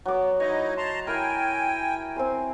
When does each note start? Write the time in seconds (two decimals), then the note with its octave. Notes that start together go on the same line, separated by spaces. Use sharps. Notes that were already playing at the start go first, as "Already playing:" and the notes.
0.06 F#3 B3 D6
0.40 D#4 E4 C#5 D#5
0.77 A5 A#5 C6
1.07 E4 A#4 G5 G#5
2.16 C4 C5 G#5